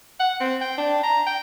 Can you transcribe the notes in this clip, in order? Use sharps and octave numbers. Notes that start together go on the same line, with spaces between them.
F#5
C4
G5
D4
A#5
G5